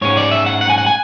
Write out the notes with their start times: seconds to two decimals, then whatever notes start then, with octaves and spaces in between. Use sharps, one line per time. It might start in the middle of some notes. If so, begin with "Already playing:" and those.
0.01 G#2 G#3 C#4 C#5
0.17 D5
0.31 E5
0.46 F#5
0.61 F#5
0.70 G#5
0.78 F#5
0.86 G#5